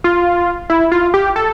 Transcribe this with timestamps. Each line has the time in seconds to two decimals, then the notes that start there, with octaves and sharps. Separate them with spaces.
0.04 F4
0.70 E4
0.92 F4
1.14 G4
1.36 A4